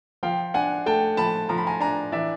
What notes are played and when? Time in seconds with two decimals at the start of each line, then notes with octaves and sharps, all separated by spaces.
0.23 F3 F5 G5
0.54 D4 F#5 G#5
0.86 A3 G5 A5
1.17 F3 A5 B5
1.49 F3 A#5
1.58 B5
1.67 G#5 A#5
1.80 D4 G#5 A#5
2.12 E3 D5 E5